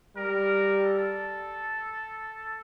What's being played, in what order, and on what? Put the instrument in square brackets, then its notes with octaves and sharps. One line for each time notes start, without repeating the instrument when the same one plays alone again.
[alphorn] G3 [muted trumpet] A#4
[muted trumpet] A4